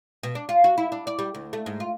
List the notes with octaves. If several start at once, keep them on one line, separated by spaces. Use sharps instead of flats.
B2
D4
F4
F#4
E4
D4
D5
G3
D2
A3
G#2
F4